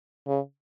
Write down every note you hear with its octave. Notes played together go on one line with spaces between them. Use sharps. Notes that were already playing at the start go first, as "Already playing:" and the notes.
C#3